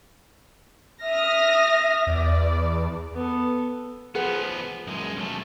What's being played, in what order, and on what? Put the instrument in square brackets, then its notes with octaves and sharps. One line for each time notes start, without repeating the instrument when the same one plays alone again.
[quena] E5 [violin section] D#6 F6 A#6
[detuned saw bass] E2 [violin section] D5
[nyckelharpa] B3 A4
[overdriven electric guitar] F3 B3 [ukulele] G#4 B4 F#5
[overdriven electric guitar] F#2 G#3
B1 A3